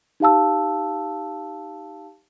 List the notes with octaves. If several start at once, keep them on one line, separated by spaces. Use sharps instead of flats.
D#4 G4 F5 A5 E6